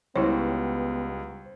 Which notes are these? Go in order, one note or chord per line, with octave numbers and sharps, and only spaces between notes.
C#2 G3 B3 E4 C5 C#5